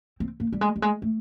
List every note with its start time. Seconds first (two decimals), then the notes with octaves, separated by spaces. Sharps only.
0.20 C4
0.40 A#3
0.52 G3
0.61 G#3
0.76 G3
0.82 G#3
1.02 A3